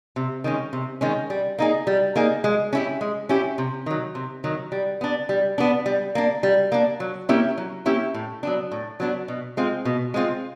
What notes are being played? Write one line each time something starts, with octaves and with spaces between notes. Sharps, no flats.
C3
D#3 G#3 C#4
C3
D#3 G#3 C#4
G3
A#3 D#4 G#4
G3
A#3 D#4 G#4
G#3
C#4 E4 G4
G#3
C#4 E4 G4
C3
D#3 F#3
C3
D#3 F#3
G3
B3 D4
G3
B3 D4
G3
A#3 D4
G3
A#3 D4
F#3
A#3 C#4 E4 G4
F#3
A#3 C#4 E4 G4
A2
F#3 B3 D4
A2
F#3 B3 D4
B2
G#3 C4 F4
B2
G#3 C4 F4